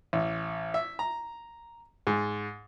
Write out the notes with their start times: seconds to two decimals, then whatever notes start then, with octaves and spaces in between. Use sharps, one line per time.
0.13 A1
0.74 E5
0.99 A#5
2.07 G#2